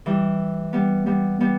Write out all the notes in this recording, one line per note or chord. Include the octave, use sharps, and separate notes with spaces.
E3 G3
G3 B3
G3 B3
G3 B3